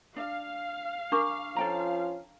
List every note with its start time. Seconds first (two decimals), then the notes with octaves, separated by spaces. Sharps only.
0.16 D4 F5
1.12 D4 A#4 C#6 D6
1.56 F3 C#4 F4 A4 G5 A#5